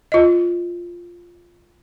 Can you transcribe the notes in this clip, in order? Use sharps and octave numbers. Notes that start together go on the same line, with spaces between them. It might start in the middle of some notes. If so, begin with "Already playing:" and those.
F4 D#5